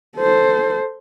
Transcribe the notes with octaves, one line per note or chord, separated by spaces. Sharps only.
A4 C5